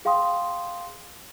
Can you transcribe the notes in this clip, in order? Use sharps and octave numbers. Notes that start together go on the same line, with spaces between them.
G#4 F5 G5 C6 D#6